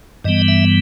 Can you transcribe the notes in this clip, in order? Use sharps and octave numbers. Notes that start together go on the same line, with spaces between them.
G2 E3 G3 B3 D#5
E5